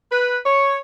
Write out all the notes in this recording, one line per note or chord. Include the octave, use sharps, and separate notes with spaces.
B4
C#5